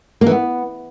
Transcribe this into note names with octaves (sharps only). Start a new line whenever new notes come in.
A#3
E3
B3